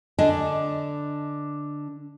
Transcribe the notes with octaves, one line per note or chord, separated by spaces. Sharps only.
D3 D4 D#5 G#5